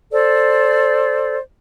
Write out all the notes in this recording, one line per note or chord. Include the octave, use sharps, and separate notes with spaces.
A4 C5 D5